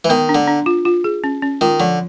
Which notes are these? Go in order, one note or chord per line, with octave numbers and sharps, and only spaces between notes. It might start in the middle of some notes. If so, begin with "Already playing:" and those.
E3
D#3 B3
D4
D3
D4
F4
F4
G#4
C#4
C#4
D#3 F4
D3 F3